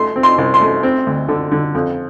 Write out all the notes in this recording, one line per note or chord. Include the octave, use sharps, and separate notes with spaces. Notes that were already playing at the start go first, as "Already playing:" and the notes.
Already playing: A3 C6
C4
C6
C2
C6
A3
C4
D2
D3
D3
F2